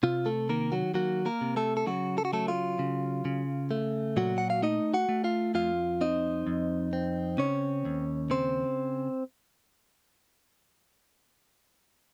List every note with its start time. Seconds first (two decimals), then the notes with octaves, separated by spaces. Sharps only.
0.03 C3 F4
0.26 A3 A4
0.49 D#3 A#3 A#4
0.72 F#3 F#4
0.94 F#3 A#3 F#4
1.26 A#3 A#4
1.41 C3
1.56 A3 A4
1.77 A4
1.86 C#3 F#3 F#4
2.18 A4
2.25 F#4
2.33 F#3 A3 A4
2.48 F4
2.79 C#3
3.25 C#3
3.71 A3
4.17 A#2 F#3 F#4
4.38 F#5
4.50 F5
4.62 A3 D#4 D#5
4.94 F#4 F#5
5.09 A3
5.24 F4 F5
5.54 F2 F4 F5
6.01 C4 D#4 D#5
6.47 F2
6.93 C4
7.38 C#3 C#4 C#5
7.85 D#2
8.30 C#3 C4 C5